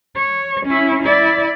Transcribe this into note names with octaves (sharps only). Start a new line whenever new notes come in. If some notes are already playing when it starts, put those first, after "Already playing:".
C#5
C#4 E4
E4 D5